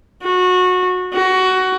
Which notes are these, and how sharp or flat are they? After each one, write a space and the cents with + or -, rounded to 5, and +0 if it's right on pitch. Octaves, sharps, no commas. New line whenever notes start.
F#4 -20
F#4 +15